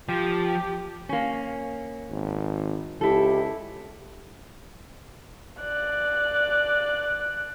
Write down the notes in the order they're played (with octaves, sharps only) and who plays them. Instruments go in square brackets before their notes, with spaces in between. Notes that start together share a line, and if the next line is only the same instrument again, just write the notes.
[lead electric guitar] F3 [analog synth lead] G4
[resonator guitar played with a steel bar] A#3 C#4
[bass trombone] G#1
[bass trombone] C#2 [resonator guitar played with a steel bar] E4 A4 [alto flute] G4
[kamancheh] D5 F#6